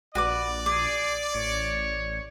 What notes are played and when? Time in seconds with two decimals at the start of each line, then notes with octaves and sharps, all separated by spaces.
0.15 A#1 F#4 B4 D5 D6
0.66 G#4 D6
1.34 A1 C#5